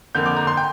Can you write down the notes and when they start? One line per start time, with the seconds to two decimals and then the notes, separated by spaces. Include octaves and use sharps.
0.15 F2 D3 A#3 G6
0.26 D6
0.37 A#5
0.47 C6
0.57 G5